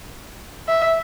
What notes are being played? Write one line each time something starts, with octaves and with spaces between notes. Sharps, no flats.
E5